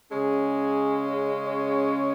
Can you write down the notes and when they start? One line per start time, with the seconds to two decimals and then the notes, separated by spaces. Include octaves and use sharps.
0.11 C#3 G#3 C#4 G#4
1.44 C#5